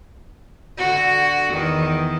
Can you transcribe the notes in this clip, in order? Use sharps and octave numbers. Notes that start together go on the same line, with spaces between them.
D3 F#4
E2 D#3